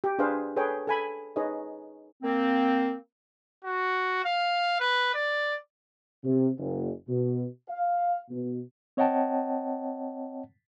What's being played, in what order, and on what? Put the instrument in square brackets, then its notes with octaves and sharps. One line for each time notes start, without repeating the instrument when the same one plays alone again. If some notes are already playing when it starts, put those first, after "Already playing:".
[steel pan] G4
D4 G#4 B4 C5 F5
G#4 A4 B4 C#5 G5
A4 G#5 B5
D#4 G#4 B4 C#5 D#5
[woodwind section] A#3 C4
[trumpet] F#4
F5
B4
D5
[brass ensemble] C3
F#1
B2
F5
B2
[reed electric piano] C4 C#5 D#5 F#5 G5 A5